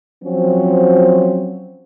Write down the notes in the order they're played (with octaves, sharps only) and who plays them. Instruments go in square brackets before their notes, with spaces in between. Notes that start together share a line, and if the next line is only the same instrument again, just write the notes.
[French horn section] F3 F#3 C4 C#4